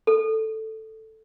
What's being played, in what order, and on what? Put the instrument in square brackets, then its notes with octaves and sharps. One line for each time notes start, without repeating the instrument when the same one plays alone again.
[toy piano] A4